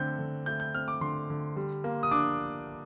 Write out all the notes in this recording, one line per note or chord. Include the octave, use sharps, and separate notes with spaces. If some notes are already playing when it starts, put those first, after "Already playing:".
Already playing: D3 A3 C4 G6
D3
A3 G6
G6
C4 F6
D6
D3 C6
D3
G3
A#3
D#6
D4 D6